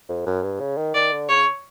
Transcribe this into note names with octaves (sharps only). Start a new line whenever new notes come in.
F2
F#2
G2
C#3
D#3
D#3 D5
D3
C#3 C#5